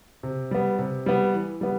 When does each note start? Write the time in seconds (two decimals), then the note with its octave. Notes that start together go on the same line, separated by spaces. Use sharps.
0.23 C3
0.51 G3 B3
0.79 C3
1.06 G3 B3
1.34 E3
1.61 G3 B3